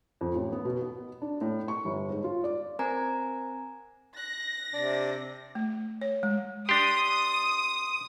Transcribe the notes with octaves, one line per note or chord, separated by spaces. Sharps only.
F2
A1
B3
B2
B3
D4
A2
C#6
G1
G#2
F4
D5
C4 A#4 C5 G#5 A#5 G#6
F#6 A#6
C3 D4 D5
A3
C#5
G#3
D4 G4 C6 D#6